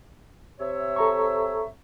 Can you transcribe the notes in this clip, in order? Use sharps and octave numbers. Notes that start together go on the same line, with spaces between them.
C3 C#5 E5
A4 A#5 C#6